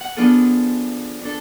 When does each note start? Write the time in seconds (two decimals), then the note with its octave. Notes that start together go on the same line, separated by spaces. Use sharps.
0.01 F#5
0.17 F3 B3 D4 F4 G#4 A4
1.21 D4 A4